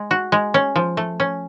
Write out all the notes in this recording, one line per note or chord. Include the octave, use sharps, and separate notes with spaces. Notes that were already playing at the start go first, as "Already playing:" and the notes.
Already playing: G#3
F#4
G#3
C#4
F3
A3
C#4